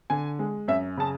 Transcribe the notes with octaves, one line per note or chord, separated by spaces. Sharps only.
D3 G#5
G#3
F#2 E5
C#3 A5